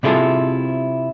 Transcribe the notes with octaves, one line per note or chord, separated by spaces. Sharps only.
C3 C4 E4 F4 G#4 A4